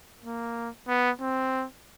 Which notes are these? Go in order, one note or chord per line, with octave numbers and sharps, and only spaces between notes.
A#3
B3
C4